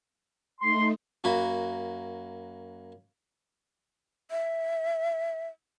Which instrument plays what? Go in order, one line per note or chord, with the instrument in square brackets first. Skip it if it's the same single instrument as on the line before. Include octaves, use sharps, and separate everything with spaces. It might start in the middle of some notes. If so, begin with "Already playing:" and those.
[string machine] A3 D#4 [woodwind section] C6
[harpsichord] F#2 A#3 F#4 B5
[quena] E5